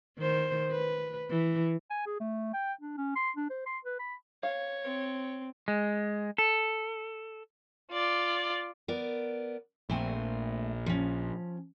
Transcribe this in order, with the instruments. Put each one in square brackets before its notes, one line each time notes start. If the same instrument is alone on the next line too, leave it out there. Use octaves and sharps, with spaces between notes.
[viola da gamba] D#3 C5
B4
E3
[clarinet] G#5
G#4
A3
G5
D4
C#4
C6
D4
C5
C6
B4
B5
[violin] C#5 [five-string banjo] F5
[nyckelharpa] C4
[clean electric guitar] G#3
A4
[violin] F4 D5
[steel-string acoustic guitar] B3 A#4 D5
[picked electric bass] A#1 [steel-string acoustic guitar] A3 C4 G#5
[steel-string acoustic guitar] F3 C#4